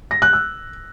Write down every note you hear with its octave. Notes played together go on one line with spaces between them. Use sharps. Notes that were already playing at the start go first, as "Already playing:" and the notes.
A#6
F#6
E6